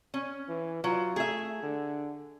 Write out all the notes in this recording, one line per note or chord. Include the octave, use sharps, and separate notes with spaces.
C#4
E3
F#3 F4
A3 G#4 E5
D3